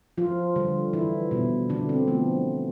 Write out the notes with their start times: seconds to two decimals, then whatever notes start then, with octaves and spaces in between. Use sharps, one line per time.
0.18 F3 F4
0.56 D3 G3
0.93 E3 E4
1.31 B2 G3
1.70 D3 D4
1.89 C4
2.07 D3 F3 A3 B3